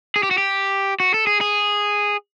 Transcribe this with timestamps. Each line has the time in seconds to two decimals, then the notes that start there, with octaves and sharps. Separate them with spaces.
0.16 G#4
0.23 G4
0.31 F#4
0.38 G4
1.00 F#4
1.14 A4
1.27 G#4
1.41 G#4